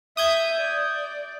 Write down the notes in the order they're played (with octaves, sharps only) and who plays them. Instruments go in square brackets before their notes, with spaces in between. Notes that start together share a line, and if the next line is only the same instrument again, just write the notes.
[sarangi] E5 [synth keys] D#6 G6 G#6
[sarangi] D5